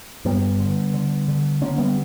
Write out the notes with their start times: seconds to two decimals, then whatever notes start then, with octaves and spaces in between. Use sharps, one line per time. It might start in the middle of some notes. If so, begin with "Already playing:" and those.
0.25 G2 G3 B3
0.60 D3
0.94 D3
1.28 D3
1.62 D3 A#3 C#4
1.78 G3 B3